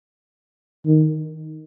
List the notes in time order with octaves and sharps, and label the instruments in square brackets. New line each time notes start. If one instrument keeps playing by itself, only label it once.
[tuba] D#3